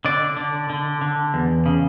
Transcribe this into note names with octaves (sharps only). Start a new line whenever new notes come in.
D3 D5
D3
D3
D3
E2
C#3